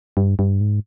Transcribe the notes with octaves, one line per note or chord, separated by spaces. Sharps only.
G2
G2
G#2